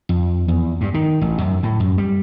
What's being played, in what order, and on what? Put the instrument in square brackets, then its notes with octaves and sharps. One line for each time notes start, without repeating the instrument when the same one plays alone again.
[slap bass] F2
E2
G2
D#3
A1
F#2
A2
F#2
G3